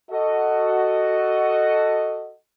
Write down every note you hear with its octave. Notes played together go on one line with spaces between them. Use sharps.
F#4 A4 D#5